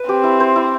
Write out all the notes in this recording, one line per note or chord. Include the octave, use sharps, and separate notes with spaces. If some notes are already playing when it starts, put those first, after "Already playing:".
Already playing: B4
C4 G4
E4
C5
E4